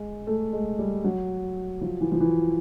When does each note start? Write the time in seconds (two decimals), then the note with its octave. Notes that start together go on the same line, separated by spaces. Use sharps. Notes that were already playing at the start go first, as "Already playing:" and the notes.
Already playing: G#3
0.27 A3
0.53 G#3
0.79 G3
1.04 F#3
1.81 F3
2.01 E3
2.12 F3
2.20 E3